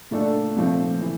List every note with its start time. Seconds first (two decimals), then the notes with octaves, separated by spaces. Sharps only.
0.11 A#2 A3 D4 A4
0.56 A#2 F3 A3 C4
1.01 E3